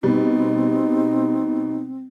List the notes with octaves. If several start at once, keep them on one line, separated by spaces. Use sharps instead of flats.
B2 G3 C4 D#4